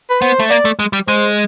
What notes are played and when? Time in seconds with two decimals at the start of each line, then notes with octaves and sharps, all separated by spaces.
0.10 B4
0.21 B3 C5
0.40 A3
0.50 A#3 D5
0.65 A3
0.79 G#3
0.93 G3
1.08 G#3 C5